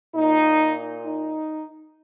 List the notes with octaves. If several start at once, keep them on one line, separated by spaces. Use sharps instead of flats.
A#2 D#4
D#4